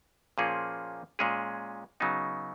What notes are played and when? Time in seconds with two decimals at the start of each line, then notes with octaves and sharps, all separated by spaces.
0.38 A#2 F3 A#3 C#4 G#4
1.19 A#2 G#3 C#4 G#4
2.00 C#3 F#3 B3 D#4